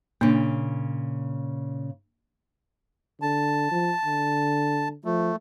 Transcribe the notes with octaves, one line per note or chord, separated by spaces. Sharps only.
A#2 C#3 A#3 D4
D3 A5
F3
D3
F3 A3